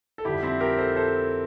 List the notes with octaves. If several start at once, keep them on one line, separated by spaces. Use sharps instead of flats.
A4
F2 D3 G3 E4 G4
C4 E4
G4 A#4
A4 C5
A4 C5